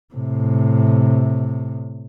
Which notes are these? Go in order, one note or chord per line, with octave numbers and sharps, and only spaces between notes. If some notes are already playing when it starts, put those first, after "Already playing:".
A2 C3